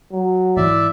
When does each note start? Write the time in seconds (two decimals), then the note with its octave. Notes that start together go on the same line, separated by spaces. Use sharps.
0.13 F#3
0.57 G#2 E3 D5 E5